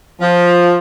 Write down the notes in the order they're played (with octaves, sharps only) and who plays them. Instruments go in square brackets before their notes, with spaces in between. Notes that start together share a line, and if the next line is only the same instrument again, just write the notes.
[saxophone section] F3